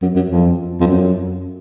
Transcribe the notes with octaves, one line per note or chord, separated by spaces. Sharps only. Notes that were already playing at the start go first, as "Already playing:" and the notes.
F#2
F#2
F2
F2
F#2